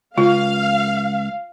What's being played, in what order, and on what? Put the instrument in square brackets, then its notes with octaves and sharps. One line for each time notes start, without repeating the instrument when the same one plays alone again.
[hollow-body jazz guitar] C#2 [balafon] F4 [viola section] F5